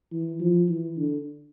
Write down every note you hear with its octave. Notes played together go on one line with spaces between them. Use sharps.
E3
F3
E3
D3